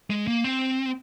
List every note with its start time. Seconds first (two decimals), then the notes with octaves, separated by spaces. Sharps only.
0.10 G#3
0.27 A#3
0.44 C4